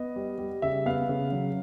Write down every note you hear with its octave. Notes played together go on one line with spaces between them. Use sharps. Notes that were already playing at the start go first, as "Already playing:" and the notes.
Already playing: B3 D#5
G3
G3
C#3 E5
B3 F5
C#3
F#3